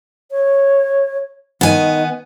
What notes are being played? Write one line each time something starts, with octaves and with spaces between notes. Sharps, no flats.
C#5
D#3 B3 G#5